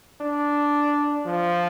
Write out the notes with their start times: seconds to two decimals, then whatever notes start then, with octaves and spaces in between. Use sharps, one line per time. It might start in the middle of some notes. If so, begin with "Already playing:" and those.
0.21 D4
1.26 F3